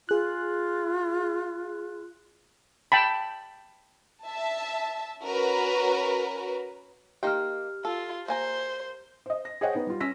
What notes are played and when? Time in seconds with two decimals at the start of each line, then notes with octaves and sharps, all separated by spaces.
0.09 F4 G#4 F#6
2.92 G5 A5 B5
4.25 E5 A5
5.21 C#4 F#4 A#4 B4
7.23 A#3 D#4 G4 G5 F6
7.85 F4 A4
8.28 A#3 C5 G#5 A#5
9.26 C5 D#5
9.45 A#6
9.61 G#4 C5 C#5 D#5 F#5 G5
9.75 B3 D#4
9.87 G3 F4
10.00 C#4 E6 A#6 B6